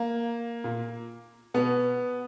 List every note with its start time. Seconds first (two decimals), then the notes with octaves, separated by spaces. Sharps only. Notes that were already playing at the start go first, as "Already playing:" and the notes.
Already playing: A#3
0.64 A#2
1.54 B2 B3